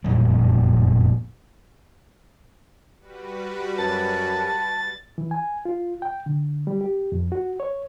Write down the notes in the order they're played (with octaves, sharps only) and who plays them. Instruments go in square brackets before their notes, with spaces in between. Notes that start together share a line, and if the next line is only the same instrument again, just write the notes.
[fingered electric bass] F#1 F2 A#2 G3
[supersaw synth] G3 F#4 B4
[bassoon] F#2 [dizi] A5 [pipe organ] A6
[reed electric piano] E3
G#5
F4
G5
D3
G3
G4
F2
F#4
C#5